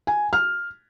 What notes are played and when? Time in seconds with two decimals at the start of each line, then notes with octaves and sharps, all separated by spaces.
0.07 G#5
0.33 F6